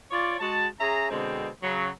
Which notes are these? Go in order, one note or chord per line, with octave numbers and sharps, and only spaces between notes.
F4 C#5 D5
G#3 F#4 A5
C#4 G#4 E5 A#5
B2 D3 G#3 C4
C#3 F#3